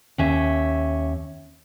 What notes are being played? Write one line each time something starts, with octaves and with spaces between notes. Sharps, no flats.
D#2 C#4 E5